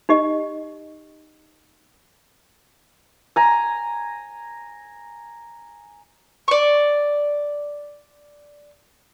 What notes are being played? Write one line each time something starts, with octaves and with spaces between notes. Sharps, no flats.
D#4 G4 D#5
G#5 A#5
D5 C#6